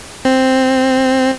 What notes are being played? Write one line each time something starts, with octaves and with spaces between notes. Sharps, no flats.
C4